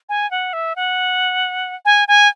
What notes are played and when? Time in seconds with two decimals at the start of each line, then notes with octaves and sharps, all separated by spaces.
0.09 G#5
0.31 F#5
0.53 E5
0.76 F#5
1.85 G#5
2.08 G#5